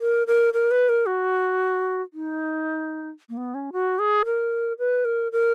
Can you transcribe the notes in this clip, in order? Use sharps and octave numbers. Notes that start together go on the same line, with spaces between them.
A#4
A#4
A#4
B4
A#4
F#4
D#4
A#3
B3
C#4
F#4
G#4
A#4
B4
A#4
A#4